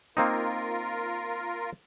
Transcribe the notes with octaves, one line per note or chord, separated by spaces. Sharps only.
A#3 C4 D#4 F4 A#4